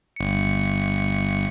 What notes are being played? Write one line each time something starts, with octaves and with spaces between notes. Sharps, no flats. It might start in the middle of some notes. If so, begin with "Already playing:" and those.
G1 C#7